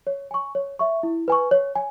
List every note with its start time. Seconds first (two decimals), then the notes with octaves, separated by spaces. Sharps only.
0.07 C#5
0.31 G#5 C#6
0.55 C#5
0.79 E5 C#6
1.03 E4
1.28 B4 G#5 C#6
1.51 C#5
1.76 G#5